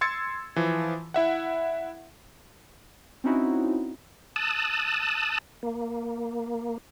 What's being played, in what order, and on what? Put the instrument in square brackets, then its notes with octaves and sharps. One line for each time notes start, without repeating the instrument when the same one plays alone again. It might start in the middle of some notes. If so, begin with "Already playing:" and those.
[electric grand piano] C6 E6 G#6 A6 C#7
E3 F3
E4 E5 F#5
[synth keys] C4 C#4 D#4 E4 F#4
[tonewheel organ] A5 D#6 E6 F#6
A#3